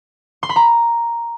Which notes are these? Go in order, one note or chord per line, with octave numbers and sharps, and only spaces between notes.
C6
B5
A#5